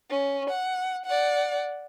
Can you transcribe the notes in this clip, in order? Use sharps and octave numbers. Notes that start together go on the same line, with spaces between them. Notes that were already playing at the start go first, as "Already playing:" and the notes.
C#4
F#5
D5 F#5